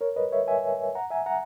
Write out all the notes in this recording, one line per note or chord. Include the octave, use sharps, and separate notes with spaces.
A#4 C#5
B4 D#5
C#5 E5
E5 G#5
F#5 A#5
E5 G#5
F#5 A#5